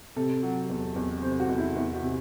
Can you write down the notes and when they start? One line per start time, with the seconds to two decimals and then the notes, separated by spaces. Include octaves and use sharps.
0.16 C3 A4
0.43 F#3
0.70 E2
0.96 E2
1.22 C3 C5
1.40 F#4
1.49 E2
1.58 E4
1.76 E2 E4
1.94 F#4
2.02 C3